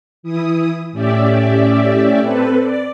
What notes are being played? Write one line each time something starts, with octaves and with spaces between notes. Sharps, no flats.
E3 E4 D#6
A2 C#4 G4 D5 E5
C4 A4 B4
D5